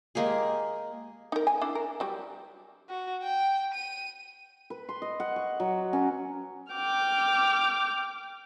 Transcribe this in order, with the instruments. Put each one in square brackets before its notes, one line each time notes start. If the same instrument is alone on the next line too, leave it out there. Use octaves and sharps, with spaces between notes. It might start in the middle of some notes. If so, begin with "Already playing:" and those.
[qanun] G#3 A#3 G4 G#4
[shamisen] D#4 A#4
G#5
D4 E4
A#4
F#3 G3
[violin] F#4
G5
D#7
[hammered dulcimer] B4
C6
D#5
F#5
C#6
F#3
C#4
[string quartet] G5 D6 F6